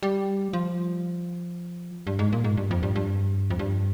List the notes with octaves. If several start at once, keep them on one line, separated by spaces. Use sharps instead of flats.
G3
F3
G2
G#2
A#2
G#2
G2
F2
G2
G2
F2
G2